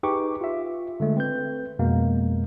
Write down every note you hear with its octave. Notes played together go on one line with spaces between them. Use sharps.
D#4 G4 G#4 B4 C#6 D6
F4 E5
D3 G#3 A3
C4 B4 G6
F2 B2 G#3 A#3